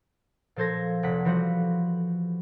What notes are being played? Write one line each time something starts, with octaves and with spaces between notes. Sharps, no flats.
A#2 F3 A4 C5 G#6 A#6
F1 F#5 B6
E3 F3 G3 F#4